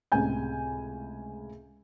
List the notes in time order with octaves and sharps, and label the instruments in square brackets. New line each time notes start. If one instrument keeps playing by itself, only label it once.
[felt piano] C#2 A2 C3 G#4 G#5 G6